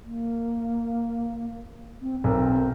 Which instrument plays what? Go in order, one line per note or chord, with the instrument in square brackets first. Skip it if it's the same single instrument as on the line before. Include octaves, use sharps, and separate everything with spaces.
[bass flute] A#3
C4
[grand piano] B1 A#4 [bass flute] C4